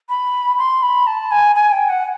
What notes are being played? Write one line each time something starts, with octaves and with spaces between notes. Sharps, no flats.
B5
C6
B5
A5
G#5
G#5
G5
F#5